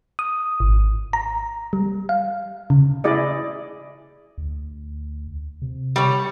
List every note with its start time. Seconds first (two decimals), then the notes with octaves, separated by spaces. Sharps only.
0.19 D#6
0.60 G#1
1.13 A#5
1.73 G3
2.09 F5
2.70 C#3
3.04 E4 G#4 D5 D#5
4.38 D2
5.62 C3
5.96 G3 C#5